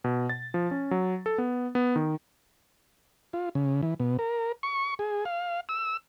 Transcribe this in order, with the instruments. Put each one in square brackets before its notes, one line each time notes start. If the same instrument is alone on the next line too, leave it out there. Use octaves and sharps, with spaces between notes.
[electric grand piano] B2
A6
F3
C#4
F#3
A4
B3
B3
D#3
[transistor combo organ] F4
C#3
E3
B2
A#4
C#6
G#4
F5
E6